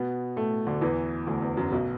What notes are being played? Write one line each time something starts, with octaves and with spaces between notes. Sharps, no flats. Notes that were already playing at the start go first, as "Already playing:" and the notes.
Already playing: B2 B3
A2 A3
D2 D3
E2 E3
D2 D3
E2
F#2
B1 B2